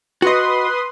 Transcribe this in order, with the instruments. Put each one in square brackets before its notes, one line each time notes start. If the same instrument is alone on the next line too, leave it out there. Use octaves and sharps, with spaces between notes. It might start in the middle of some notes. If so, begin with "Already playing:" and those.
[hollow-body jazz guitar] F#4 D#5 [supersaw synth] B4 C6 D#6